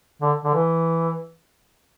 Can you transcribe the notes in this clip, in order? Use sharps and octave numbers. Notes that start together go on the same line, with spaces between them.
D3
D3
E3